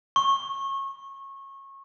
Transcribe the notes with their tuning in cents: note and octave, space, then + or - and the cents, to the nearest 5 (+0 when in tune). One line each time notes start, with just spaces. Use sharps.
C#6 -25